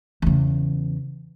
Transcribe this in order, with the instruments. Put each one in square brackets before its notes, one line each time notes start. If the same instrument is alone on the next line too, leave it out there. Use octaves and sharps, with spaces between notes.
[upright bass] E2 C#3